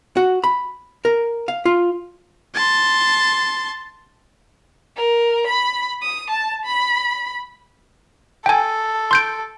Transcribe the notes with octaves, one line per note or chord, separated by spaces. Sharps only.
F#4
B5
A#4
F5
F4
A5 C6
A#4
B5
D#6
A5
B5
A4 G5 G#5
C6 G6 D7